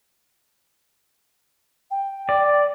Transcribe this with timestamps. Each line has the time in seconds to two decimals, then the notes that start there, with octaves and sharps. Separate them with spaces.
1.90 G5
2.29 D5